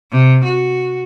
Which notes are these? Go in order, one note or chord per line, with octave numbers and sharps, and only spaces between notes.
C3
F#4